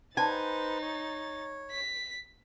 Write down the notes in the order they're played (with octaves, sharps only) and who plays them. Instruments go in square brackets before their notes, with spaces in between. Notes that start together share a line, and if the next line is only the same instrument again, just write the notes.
[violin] D#4 A6 [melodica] B4 C5 [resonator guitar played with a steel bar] G#5
[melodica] C#5
[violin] B6